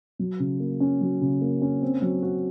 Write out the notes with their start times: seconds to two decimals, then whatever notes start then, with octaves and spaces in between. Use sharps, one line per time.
0.19 F#3
0.40 C#3
0.60 A#3
0.80 C#4
1.01 F#3
1.21 C#3
1.41 A#3
1.62 C#4
1.82 C4
2.02 F#3
2.22 F#4